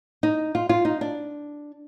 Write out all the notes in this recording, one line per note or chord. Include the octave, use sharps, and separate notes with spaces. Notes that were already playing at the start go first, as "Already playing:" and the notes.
D#4
F4
F4
D#4
D4